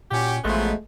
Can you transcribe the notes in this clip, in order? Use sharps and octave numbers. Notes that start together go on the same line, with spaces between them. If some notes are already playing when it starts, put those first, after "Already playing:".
A#2 C#4 F#4 G4
A1 F3 F#3 G#3 A3 B3